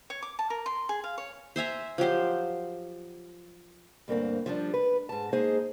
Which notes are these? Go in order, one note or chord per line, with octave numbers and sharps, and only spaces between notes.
C#5
D6
A5
A#4
C6
G#4
F5
C#5
C5 E5 G#5 A#5
F3 F#3 G4 C5
D2 G2 A#3 C4
F3 G3 D4
B4
G#2 A5
G#3 A#3 D#4 G#4 C5